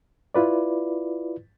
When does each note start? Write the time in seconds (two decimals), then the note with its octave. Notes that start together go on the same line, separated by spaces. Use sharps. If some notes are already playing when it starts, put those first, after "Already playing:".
0.34 E4 F4 B4 D5